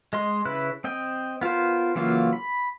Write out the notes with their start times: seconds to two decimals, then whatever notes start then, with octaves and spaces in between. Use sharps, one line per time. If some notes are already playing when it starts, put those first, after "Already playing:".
0.13 G#3 D#5 C6
0.45 C#3 E4 B4 F#6
0.84 C4 D#5 G5
1.41 B3 F4 A#4 C5
1.95 C#3 E3 F#3 A#3 F4
2.33 B5